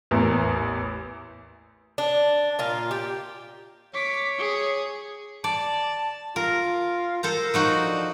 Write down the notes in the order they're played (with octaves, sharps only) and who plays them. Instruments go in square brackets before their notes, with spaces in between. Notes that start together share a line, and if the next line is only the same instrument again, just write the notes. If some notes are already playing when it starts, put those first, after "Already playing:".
[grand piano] A1 E2 A#4
[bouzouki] D4
A#2 F4
G4
[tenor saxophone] C#5 [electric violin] D6 B6
[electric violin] G#4
[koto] D5 [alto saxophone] A5
[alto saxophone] F4 [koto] A#4
[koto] A4 C5 A#5 [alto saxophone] A#4
[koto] F3 D#4 F#4
[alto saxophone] D4